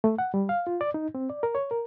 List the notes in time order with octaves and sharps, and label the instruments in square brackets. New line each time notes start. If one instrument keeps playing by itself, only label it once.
[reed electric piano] A3
F#5
G3
F5
F4
D5
D#4
C4
D5
A#4
C#5
A#4